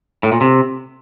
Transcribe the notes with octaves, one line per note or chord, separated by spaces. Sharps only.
A2
A#2
C3